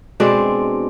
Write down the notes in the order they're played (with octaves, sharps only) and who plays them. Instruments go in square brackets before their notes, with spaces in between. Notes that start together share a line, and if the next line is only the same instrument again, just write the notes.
[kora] B2 G#3 C4 D4